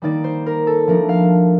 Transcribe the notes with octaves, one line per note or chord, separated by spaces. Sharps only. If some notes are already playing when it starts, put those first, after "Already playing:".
D#3 G3 A#3 D#4 D5
C5
A#4
A4
F3 A3 D4 A#4
F5